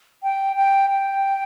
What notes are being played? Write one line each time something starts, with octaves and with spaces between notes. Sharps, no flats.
G5
G5
G5